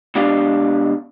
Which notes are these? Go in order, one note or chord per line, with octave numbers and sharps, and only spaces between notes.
B2 G#3 D4 G4 D5 F5